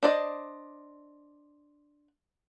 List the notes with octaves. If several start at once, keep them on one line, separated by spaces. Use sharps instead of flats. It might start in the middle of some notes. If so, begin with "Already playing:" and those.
D4 C5 D5 D#5